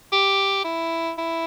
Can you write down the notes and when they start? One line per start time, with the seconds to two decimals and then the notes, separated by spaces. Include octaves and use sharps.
0.12 G4
0.64 E4
1.18 E4